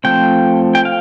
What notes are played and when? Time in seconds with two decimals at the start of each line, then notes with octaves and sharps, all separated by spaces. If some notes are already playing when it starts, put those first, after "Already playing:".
0.04 F3 A3 C4 G5
0.75 G5
0.85 F5